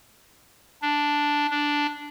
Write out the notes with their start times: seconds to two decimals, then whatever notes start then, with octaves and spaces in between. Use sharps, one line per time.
0.82 D4
1.51 D4